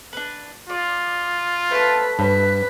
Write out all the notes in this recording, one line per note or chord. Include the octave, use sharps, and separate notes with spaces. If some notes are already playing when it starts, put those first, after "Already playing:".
D4 B4
F4 D5
A3 B4 A5
G2 B4